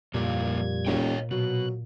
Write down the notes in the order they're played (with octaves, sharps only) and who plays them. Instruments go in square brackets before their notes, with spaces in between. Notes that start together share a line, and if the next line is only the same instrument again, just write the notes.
[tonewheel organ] F2 G3 G#6 [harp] A#2 [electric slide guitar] F3 A#3 G4
[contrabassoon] E1 [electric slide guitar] C#5 D#5 G5
[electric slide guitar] B2 [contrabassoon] F#3 [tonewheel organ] F#6